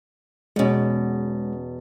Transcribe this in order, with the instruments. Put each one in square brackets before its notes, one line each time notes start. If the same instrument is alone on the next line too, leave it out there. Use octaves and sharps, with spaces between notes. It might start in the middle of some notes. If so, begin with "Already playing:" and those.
[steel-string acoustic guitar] E2 B2 [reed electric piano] G#3 C#4